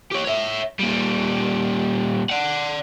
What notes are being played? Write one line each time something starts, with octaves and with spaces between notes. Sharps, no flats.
G4 C#5
C#5 E5
A#2 G3
D5 F#5